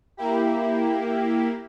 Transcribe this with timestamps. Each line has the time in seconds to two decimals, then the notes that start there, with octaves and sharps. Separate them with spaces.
0.17 A#3 E4 G4